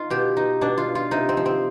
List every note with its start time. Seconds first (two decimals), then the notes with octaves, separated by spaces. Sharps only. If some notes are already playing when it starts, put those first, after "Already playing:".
Already playing: D#4 F4
0.10 B2 G4
0.37 D#4
0.61 B2 D4
0.78 F4
0.95 F4
1.11 C3 D#4
1.29 C4
1.37 F3
1.46 C4